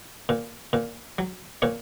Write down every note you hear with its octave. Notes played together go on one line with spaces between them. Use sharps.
A#2
A#2
F#3
A#2 C#5